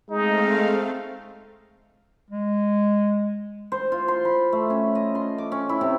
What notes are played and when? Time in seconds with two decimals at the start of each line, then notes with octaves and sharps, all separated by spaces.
0.10 G#3 A3 C4 D#4 F5
2.31 G#3
3.72 C5
3.92 F4
4.08 C6
4.25 B5
4.52 A3
4.70 C#4
4.95 D#5
5.15 C6
5.38 D6
5.52 C#4
5.69 E4
5.81 C3